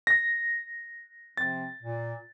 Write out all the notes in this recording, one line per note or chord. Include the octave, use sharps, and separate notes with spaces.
A#6
C3 F3 C4 A6
A#2